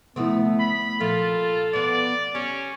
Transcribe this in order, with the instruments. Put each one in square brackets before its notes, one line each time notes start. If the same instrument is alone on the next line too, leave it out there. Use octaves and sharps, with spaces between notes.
[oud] D2 A3 C4 [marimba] C3 F3 E4 [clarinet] B3
[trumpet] B5
[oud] A#2 [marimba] F3 [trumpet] F4 [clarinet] A4
[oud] B2 B3 [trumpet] D5
[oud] G3 [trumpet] C#4